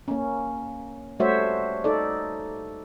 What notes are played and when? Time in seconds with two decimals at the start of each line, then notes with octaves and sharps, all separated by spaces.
0.08 A#3 C#4
1.20 G3 A3 F#4 C5 C#5 E5
1.84 D#4 A4 D5